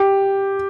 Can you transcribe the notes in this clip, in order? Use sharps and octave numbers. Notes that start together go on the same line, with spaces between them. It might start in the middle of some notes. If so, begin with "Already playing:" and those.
Already playing: G4